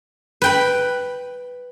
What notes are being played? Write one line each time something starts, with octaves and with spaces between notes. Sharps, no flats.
B4 G5 B5